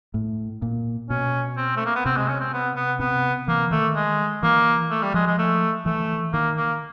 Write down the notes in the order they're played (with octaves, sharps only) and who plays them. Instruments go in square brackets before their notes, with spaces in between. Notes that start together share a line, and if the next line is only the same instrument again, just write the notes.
[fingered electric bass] A2
A#2
[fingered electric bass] B2 [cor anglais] C#4
[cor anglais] C4
A3
A#3
B3
[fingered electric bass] C3 [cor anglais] C4
[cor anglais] G#3
C#4
C4
B3
B3
[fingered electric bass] C3 [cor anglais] B3
[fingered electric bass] E3 [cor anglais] A#3
[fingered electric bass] D#3 [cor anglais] A3
[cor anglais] G#3
[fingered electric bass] E3 [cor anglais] A#3
[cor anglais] A3
G3
[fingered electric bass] F3 [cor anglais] G#3
[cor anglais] G#3
A3
[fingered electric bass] E3 [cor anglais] A3
[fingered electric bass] D#3 [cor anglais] A#3
[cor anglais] A#3